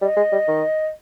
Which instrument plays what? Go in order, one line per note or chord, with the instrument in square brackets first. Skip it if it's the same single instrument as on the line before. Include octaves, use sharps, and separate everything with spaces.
[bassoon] G3 [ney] D#5
[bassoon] G#3
G3
D#3